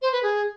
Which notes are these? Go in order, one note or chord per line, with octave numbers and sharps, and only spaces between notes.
C5
B4
G#4